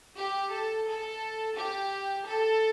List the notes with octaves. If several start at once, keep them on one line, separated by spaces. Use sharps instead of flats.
G4
A4
A4
G4
A4